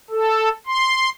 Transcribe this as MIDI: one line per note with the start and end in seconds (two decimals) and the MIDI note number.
0.10 0.49 69
0.67 1.10 84